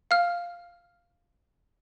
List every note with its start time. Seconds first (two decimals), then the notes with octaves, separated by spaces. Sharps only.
0.11 F5 F6